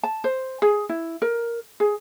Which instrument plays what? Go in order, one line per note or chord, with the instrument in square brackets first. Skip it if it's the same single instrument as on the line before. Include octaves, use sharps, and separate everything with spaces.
[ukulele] A5
C5
G#4
E4
A#4
G#4